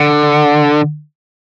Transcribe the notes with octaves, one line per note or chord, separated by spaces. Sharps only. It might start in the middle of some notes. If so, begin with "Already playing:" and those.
Already playing: D3